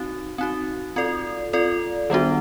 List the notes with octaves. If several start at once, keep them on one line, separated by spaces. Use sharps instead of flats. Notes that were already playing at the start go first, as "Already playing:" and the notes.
Already playing: C4 D#4 F#4
C4 D#4 F#4
C4 F4 A4 D5
C4 F4 A4 D5
D#3 G3 B3 D4 F#4